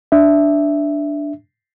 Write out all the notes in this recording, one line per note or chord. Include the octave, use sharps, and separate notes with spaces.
D4 E5